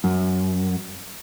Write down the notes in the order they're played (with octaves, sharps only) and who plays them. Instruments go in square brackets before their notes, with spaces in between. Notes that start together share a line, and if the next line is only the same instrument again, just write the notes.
[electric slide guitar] F#2